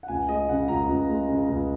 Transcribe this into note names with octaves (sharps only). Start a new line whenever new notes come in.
F#5
C#2 G#5
G#3 D#5
C#3 F#5
C#2 A#5
C#2
G#3
C#3
C#2